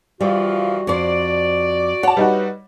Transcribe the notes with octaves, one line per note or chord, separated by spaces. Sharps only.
E3 F3 G3 F4 F#4
F2 C5 D5
C#5 F#5 A5
G3 D#4 F#4 B4